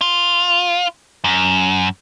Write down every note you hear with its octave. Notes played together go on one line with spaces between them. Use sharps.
F4
F#2